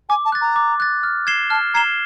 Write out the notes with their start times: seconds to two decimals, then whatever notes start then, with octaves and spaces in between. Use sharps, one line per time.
0.09 G#5 D6
0.25 A5
0.32 F#6 A6
0.41 A#5
0.56 D6
0.80 F#6 A6
1.03 F6
1.27 G#6 C7 E7 G7
1.50 A5 F6
1.74 A#5 G#6 C7 E7 G7